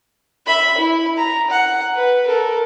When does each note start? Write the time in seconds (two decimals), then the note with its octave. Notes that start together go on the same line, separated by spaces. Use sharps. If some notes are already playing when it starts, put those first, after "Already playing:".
0.47 E5 B5
0.78 E4
1.17 A#5
1.50 F#5
1.96 B4
2.26 A4 A#4